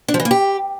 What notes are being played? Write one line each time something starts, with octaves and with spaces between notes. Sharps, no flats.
D4
F3
E3
A#3
G4